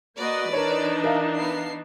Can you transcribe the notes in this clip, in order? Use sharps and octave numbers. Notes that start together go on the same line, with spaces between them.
A#3 F#4 B4 D5 D#5
E3 D4 D#4 A#4 C#5
A#4 E5 F5
B3 C7